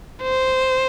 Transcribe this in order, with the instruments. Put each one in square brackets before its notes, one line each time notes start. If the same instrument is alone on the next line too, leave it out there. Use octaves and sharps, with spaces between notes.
[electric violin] C5